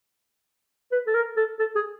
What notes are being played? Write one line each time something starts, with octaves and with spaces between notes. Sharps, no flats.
B4
A4
A#4
A4
A4
G#4